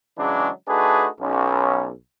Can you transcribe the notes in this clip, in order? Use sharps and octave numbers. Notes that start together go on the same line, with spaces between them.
C#3 E3 F#3 G#3 C#4 D4
A3 D4 D#4 F#4 G#4 B4
B1 C#4